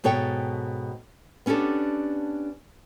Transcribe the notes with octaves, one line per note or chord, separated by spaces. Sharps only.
G#2 B2 A4 C#5 G5
B3 C#4 D4 G4 A4